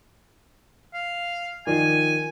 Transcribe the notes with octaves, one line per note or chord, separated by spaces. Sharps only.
F5
D#3 F3 D5 G#5